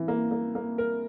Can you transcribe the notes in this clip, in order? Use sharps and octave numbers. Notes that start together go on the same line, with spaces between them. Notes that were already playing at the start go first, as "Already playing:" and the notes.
Already playing: E3
A#3
A#3
A#3
A#4